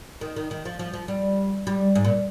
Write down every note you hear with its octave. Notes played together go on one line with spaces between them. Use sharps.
D#3
D#3
D#3
F3
F3
F3
G3
G3
G#2
A#2